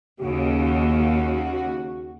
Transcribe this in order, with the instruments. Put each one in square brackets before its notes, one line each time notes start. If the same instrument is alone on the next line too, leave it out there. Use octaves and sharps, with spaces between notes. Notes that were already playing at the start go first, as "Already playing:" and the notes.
[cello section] D#2 C#3 [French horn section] F#4